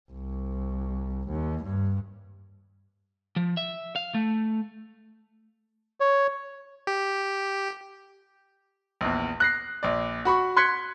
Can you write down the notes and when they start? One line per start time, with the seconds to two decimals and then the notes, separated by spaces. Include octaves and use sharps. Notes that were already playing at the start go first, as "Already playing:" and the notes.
0.12 C2
1.29 D#2
1.64 G2
3.36 F3
3.57 E5
3.96 F5
4.14 A3
6.00 C#5
6.87 G4
9.01 A#1 E2
9.40 F#6 A#6 C7
9.83 A#1 D5
10.25 F#4 B5 C#6
10.57 C6 F#6 G#6 B6 C#7